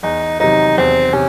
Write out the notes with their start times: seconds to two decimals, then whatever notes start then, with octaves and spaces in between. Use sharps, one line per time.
0.03 E2 D#4
0.40 C3 D#3 F#3 D#4
0.77 E2 C4
1.13 C3 C#4